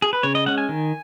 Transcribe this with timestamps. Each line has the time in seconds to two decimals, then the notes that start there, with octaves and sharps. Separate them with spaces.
0.02 G#4
0.13 B4
0.23 C#3 C#5
0.35 D#5
0.46 G#3 C#4 F#5
0.58 G#5
0.69 D#3